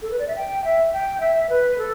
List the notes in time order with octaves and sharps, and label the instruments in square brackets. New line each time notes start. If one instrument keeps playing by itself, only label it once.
[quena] A4
B4
D5
E5
G5
E5
G5
E5
B4
A4